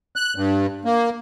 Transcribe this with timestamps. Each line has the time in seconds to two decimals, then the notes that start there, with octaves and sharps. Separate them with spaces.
0.16 F#6
0.36 G2
0.85 A#3